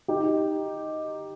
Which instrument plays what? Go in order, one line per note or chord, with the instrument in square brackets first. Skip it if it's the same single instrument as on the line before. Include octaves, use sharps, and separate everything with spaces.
[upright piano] D#4 G4